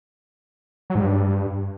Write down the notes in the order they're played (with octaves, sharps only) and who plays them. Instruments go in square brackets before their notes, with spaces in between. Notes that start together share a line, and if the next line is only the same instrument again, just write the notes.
[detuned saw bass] F#3
G#2
G2